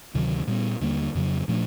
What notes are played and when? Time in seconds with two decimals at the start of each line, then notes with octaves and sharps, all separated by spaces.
0.14 D2 C3 D#3 F#3
0.47 A#2 G3 B3
0.80 D#2 D3 G3 A#3
1.15 F2 C#3 F#3
1.48 A#2 F3 A3 D4